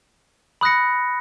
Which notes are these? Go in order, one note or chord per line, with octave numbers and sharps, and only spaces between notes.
B5 D#6 F#6 A#6 C#7